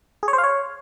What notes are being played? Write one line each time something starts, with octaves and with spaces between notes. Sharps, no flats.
G#4
C#5
C5
F5
C#5